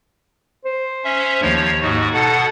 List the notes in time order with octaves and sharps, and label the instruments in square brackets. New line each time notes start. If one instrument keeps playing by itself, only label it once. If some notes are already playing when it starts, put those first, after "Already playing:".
[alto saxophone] C5
[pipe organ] C#4 E5
[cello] D#2 [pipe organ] F3 C#5
[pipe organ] G#2 F#4 [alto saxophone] D#4
[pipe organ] B2 F#5 [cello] A4 [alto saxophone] A5